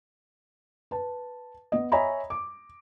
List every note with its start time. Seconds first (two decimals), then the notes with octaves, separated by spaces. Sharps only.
0.91 B4 A5
1.72 B3 D#5
1.92 C#5 D#5 E5 G#5 A#5 B5
2.30 D6